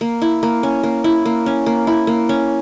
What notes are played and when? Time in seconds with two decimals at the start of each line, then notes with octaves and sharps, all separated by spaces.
0.01 A#3
0.22 E4
0.43 A#3
0.63 C#4
0.83 A#3
1.04 E4
1.26 A#3
1.46 C#4
1.66 A#3
1.87 E4
2.07 A#3
2.29 C#4